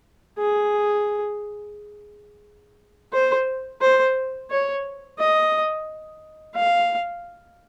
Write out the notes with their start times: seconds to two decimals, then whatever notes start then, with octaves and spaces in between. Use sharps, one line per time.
0.39 G#4
3.13 C5
3.81 C5
4.51 C#5
5.19 D#5
6.56 F5